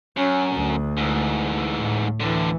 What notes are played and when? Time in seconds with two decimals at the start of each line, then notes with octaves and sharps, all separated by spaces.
0.17 F#2 C#4
0.55 D2
0.97 G#2 E3
1.77 A2
2.20 D2 A2 D3 E3